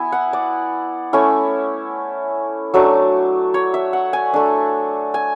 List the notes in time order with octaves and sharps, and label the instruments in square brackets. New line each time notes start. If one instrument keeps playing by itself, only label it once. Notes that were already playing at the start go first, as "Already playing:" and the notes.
Already playing: [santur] B3 E4 G#5
F#5
D5
A3 C#4 E4
F#3 A3 D4
C#5
E5
F#5
G#5
A3 D4
G#5